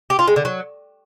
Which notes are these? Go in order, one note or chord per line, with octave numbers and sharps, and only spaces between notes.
G4
F4
G#3
D3
F#3